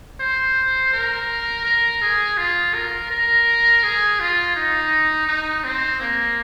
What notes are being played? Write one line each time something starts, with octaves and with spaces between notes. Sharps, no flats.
C5
A#4
A#4
G#4
F4
A#4
A#4
G#4
F4
D#4
D#4
C4
A#3